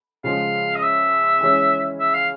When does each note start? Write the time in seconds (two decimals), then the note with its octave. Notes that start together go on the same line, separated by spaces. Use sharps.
0.24 C#3 F3 G#3 F5
0.75 D#5
0.82 E5
1.41 E3 G#3 C#4 E4
2.00 E5
2.14 F5